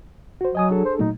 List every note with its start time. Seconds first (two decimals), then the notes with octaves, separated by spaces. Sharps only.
0.41 F#4 C5
0.55 F#3 D#5 G#5 D#6
0.71 D4 G#4 A4
0.85 C5
0.99 A#2 F#3 A3 D#4